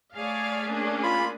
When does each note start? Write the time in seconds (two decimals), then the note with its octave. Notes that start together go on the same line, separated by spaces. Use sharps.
0.15 A3 G#4 C#5 D5 F5
0.69 A#3 C#4 D4
1.03 F4 B5